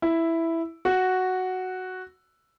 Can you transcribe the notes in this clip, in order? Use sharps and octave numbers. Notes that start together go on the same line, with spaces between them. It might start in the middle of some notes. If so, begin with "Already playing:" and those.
E4
F#4